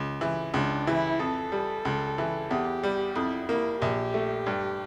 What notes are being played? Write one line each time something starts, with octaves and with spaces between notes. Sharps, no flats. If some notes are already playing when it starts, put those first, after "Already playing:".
Already playing: C#2
E3
C#2 D4
E3 E4
F2 A4
G3
C#2
E3
E2 G4
G3
F2 E4
A#3 E4
A#1 G4
A3
G2